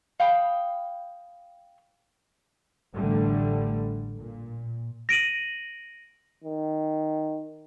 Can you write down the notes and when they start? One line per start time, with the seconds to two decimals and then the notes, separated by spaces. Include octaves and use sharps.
0.20 F5 G5 B5 D#6
2.94 A1 D3 G3 A3
4.18 A#2
5.09 A#6 D7 D#7 F#7
6.44 D#3